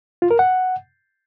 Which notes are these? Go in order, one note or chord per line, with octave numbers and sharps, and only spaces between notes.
F4
A#4
F#5